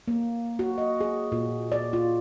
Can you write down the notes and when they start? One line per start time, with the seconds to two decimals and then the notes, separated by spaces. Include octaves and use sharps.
0.08 A#3
0.59 F#4
0.78 D#5
1.01 G#4
1.32 A#2
1.72 D5
1.93 F4